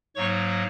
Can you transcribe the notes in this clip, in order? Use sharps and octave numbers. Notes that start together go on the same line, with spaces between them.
G#2 F#3 A#3 D#4 C#5 C#6